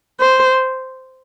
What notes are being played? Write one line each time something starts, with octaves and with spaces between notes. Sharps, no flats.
C5